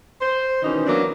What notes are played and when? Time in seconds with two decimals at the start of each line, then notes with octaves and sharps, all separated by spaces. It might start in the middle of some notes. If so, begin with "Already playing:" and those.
0.21 C5
0.62 B2 D#3 E3 C#4 D#4
0.87 E3 F#3 A#3 B3 D4